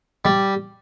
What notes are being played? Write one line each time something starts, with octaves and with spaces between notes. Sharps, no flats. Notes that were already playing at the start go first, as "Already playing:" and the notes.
G3